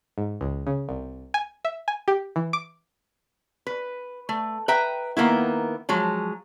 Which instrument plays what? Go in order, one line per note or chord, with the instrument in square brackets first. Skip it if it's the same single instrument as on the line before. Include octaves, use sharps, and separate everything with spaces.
[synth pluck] G#2
C#2
C#3
C2
G#5
E5
G#5
G4
E3
D6
[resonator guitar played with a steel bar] B4
A3
B4 E5 G5 A#5
D#3 A#3 B3 E4
F3 F#3 G#3